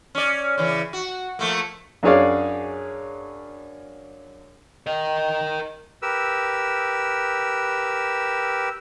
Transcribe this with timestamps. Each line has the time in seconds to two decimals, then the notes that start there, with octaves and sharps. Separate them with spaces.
0.15 C#4 D5
0.58 C#3 E3
0.93 F#4
1.39 F3 A3 A#3
2.03 F#2 D4 G#4 C#5 D5 F5
4.87 A#4 D#5
6.02 G4 A#4 B4 E6